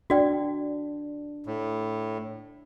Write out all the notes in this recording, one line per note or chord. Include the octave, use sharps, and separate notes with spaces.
D4 F#4 D5 G5
A2